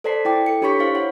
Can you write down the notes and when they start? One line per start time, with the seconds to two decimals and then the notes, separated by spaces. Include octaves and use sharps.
0.04 A4 C5 D5 A5 B6 C7
0.25 E4 G5 D6
0.46 A4 C#7
0.62 D4 G4 C#5 B5 C#6 B6
0.79 E4 C5 F5
0.95 C#5 F#5